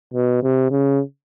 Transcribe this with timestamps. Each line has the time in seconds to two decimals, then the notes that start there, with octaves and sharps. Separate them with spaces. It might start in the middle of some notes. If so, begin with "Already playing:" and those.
0.14 B2
0.43 C3
0.71 C#3